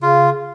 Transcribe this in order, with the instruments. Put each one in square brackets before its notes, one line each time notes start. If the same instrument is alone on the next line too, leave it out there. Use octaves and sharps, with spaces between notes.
[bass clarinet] C#3 [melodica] F4